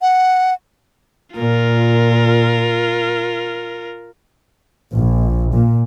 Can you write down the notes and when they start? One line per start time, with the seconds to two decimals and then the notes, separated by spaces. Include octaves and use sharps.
0.02 F#5
1.36 A#2 F4 A#4
4.92 A#1
5.53 A#2